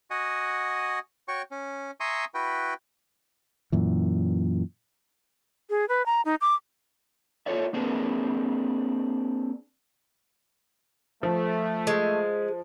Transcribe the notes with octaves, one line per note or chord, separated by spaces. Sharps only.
F#4 D#5 F#5 G#5
F#4 C#5 G5 C#6
C#4
E5 G#5 A#5 C6 C#6 D#6
E4 F#4 B4 G5
F#2 A#2 E3
G#4
B4
A#5
D#4
D6
F4 A4 C#5 D5 E5
A#3 C4 D4 G#4 A#4 B4
F3 A3
G#3